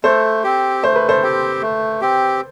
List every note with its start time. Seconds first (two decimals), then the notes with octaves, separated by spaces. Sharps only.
0.04 A3 A4 C5
0.44 C4 G4
0.83 A3 C5
0.96 B4
1.09 A4 C5
1.22 C4 G4
1.62 A3
2.01 C4 G4